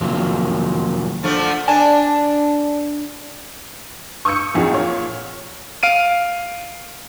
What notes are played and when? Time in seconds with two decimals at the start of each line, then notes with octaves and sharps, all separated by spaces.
0.01 F2 C3 D#3 F#3 A#3 F4
1.23 D3 F3 A3
1.68 D4 D5 G#5 A5
4.25 C#6 D#6 E6 G6 C#7
4.54 B1 F2 D#4 F#4 G#4
4.71 A#2 C#5
5.83 F5 D7 D#7